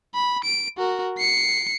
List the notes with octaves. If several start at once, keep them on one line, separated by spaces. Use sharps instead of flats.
B5
D7
F#4 A#4
C7 C#7